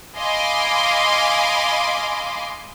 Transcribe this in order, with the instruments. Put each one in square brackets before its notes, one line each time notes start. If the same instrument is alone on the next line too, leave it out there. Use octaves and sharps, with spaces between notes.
[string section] D#5 F5 G#5 B5 C6 D6